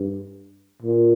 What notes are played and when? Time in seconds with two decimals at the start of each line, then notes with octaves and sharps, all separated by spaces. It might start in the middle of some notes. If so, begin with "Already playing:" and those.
Already playing: G2
0.82 A#2